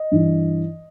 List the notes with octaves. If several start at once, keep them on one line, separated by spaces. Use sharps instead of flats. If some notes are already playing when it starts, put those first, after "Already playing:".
Already playing: D#5
G2 E3